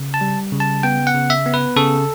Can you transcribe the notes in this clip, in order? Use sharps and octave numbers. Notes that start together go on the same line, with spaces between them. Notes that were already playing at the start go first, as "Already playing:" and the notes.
Already playing: C#3
A5
G3
C#3
A5
B3 G5
F#5
C#3
E5
B3
B4
C#3 A4